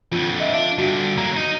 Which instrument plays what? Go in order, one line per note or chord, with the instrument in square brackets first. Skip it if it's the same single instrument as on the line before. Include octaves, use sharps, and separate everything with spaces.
[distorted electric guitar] F2 D3 [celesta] F4
[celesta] D#5 E5
[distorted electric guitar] D4 [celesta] F5
[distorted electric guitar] G2 D3 [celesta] F#4
[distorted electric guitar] F#3 A#3 [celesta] A#5
[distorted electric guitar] D#4